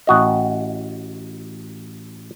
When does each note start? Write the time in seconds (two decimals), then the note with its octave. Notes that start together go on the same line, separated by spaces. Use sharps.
0.07 A1 F#4 D#5